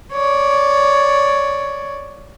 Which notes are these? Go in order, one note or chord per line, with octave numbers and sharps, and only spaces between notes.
C#5 D5